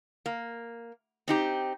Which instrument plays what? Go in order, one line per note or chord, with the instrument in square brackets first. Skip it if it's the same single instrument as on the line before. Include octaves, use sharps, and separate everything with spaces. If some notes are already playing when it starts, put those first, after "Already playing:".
[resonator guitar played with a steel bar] A#3
C4 D#4 G4